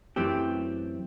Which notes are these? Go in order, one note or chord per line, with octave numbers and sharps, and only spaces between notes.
F#2 E3 A3 C4 G4